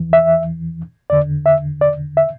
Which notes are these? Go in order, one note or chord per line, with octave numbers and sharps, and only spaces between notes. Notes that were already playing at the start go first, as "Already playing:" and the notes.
Already playing: E2 E3
E5
E2 D3 D5
E5
D5
E5